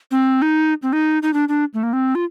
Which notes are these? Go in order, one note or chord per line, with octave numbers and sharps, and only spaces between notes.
C4
D#4
C4
D#4
D#4
D4
D4
A3
A#3
C4
F4